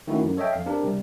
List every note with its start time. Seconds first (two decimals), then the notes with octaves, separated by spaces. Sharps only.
0.07 D#3 A3 C#4 D#4 E4 F#4
0.23 F#2
0.37 A4 C#5 D#5 E5 G5
0.53 F2 F5
0.66 C4 D4 G4 A#4
0.83 C3 G3